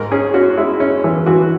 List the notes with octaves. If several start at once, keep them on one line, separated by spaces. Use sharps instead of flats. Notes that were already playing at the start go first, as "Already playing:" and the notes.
Already playing: G#2 A#4
C#4 G#4
C#4 F#4
G#3 E4
C#4
E3
E3 F#4